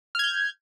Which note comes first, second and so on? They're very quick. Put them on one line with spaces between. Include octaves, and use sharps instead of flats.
F6 G#6 G6